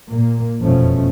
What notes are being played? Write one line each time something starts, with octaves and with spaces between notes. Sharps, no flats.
A#2 A#3
F1 F#2 B2 F3 A3 C#4